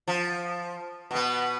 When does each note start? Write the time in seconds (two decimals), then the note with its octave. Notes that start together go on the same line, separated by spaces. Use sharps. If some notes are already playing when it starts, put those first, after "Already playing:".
0.08 F3
1.11 B2 B3